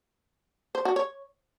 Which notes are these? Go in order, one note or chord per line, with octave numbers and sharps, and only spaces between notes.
C5
F#4
C#5